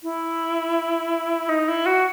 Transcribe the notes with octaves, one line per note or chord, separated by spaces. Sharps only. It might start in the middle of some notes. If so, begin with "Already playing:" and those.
E4
D#4
E4
F#4